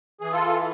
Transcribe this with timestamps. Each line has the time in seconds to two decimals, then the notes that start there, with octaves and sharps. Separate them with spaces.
0.21 E3 G#4
0.32 F4 A4